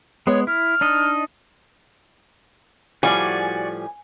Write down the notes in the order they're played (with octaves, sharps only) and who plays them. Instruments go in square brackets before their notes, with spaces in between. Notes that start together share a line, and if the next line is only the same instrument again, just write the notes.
[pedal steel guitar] G#3 B3 [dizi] C#5
[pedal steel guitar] E4 [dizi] F6
[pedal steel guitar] D4 D#4 D#5
[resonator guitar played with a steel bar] A2 F3 G3 [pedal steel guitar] F#4 D5 [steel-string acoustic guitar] G#5